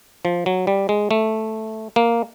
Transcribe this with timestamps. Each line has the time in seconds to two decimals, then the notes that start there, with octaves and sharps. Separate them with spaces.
0.25 F3
0.46 F#3
0.67 G3
0.89 G#3
1.11 A3
1.96 A#3